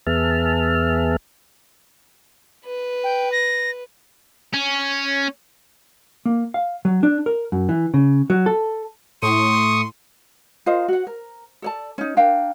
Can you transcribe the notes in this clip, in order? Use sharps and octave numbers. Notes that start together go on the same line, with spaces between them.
E2 B3 G#4 E5 A5 F6
B4
G5
A#6
C#4
A#3
F5
F#3
D4
A#4
F#2
E3
C#3
F#3
A4
A2 C6 C#6 D#6
F4 A#4 C5 D#5
F#4 F#5
A#4
A4 D5 A5
C#4 D#4
D4 A#4 F5 G5